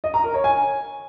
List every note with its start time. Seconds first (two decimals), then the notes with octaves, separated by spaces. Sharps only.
0.04 D#5
0.14 A#5
0.24 A#4
0.34 C#5
0.44 G#5